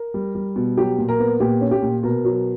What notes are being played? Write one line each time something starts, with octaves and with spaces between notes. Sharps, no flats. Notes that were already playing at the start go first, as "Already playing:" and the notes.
Already playing: A#4
G3
G3
B2
F#3 G4
A#2
A#4
B3
A#2 G4
C#4
G4
A#2
B2 A#4
F#3